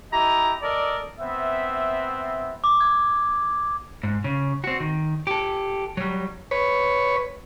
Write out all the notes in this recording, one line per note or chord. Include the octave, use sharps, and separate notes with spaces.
E4 G4 D#5 A#5
A4 A#4 D5 D#5
B3 C4 E5
D6
G#6
G#2
C#3
C4 F#4
D#3
G4 A4
F#3 G3
B4 C#5